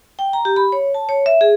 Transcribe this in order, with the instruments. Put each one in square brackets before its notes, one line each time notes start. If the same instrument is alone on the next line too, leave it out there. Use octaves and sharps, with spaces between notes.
[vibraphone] G5
A#5
G4
B5
C#5
A5
C#5
E5
G#4